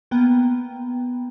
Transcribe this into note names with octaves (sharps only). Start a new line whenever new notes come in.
A#3 B3 G5